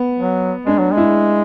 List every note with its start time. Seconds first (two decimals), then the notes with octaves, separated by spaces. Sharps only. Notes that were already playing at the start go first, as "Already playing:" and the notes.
Already playing: B3
0.19 F#3
0.66 G#3 D4
0.79 F#3
0.92 G#3
0.97 E4